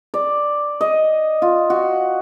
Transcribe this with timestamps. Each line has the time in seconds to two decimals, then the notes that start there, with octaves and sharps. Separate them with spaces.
0.14 D5
0.81 D#5
1.42 F4
1.70 F#4